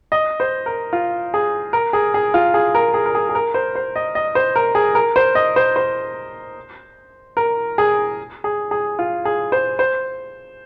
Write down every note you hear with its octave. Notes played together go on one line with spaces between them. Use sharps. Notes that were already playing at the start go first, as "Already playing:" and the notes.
D#5
C5
A#4
F4
G#4
A#4
G#4
G#4
F4
G#4
A#4
G#4
A#4
G#4
G#4
A#4
C5
C5
D#5
D#5
C5
A#4
G#4
A#4
C5
D#5
C5
C5
A#4
G#4
G#4
G#4
F4
G#4
C5
C5